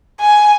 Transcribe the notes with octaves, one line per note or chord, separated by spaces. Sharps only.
G#5